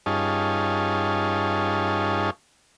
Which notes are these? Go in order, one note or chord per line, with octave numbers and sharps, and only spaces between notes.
G2 C#4 D#4 F4 G#4 A5